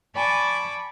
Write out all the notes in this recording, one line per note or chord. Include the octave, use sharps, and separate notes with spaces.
D5 G#5 A5 B5 C#6 D6